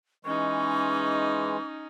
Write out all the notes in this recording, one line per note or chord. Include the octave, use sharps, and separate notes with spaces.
E3 G#3 C#4 D#4 C#6